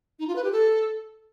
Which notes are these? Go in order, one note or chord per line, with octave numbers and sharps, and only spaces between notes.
D#4
F4
B4
G4
A4